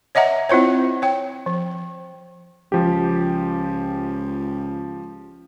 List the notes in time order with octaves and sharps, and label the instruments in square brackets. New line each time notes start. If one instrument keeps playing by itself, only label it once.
[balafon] C#5 D#5 E5 F#5 A#5
C4 E4 F4 C5 C#5
C#5 G5
F3
[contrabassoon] C#2 [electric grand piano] F3 G4